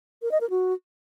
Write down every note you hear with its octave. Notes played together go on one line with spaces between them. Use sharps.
A#4
D#5
A#4
F#4